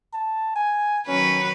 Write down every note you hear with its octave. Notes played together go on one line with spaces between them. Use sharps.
A5
G#5
D#3 F#3 C#4 B4